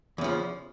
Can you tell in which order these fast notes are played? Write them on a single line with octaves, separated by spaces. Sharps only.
E2 C#3 F3